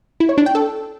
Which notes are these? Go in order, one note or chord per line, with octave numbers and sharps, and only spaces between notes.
E4
C#5
D4
G5
A4